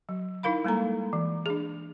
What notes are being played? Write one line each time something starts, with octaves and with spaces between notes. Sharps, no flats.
F#3
D#4 E4 A#4 F5 B5
G3 G#3 A#3 A4 A#5
E3
D4 G#4